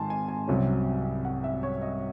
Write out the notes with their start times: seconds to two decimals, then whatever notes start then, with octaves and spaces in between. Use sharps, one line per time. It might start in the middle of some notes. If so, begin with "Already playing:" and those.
Already playing: G#1 G#2 D#3 G#5 A5 C6
0.10 G#5
0.28 G#5
0.48 C2 C3 F#3 C#4
1.25 F#5
1.44 E5
1.63 C#5
1.82 D#5